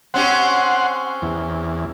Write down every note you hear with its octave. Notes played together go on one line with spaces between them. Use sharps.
C4 C#4 G4 F#5 C6
E2